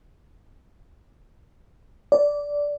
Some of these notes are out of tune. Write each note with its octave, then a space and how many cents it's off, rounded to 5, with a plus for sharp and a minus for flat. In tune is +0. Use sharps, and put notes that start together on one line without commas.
D5 -15